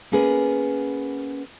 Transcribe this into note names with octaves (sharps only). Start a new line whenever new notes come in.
A#3 B3 C#4 G#4 A#4 B4